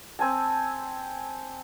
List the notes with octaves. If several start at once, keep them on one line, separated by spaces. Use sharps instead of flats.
C4 G#5 A5